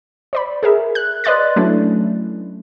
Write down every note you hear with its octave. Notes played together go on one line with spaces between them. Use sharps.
C5 D5 B5
G#4 A#4 E5
F#6
B4 D5 D#5 C6 F#6 A6
F#3 A3 C#4 D4 E4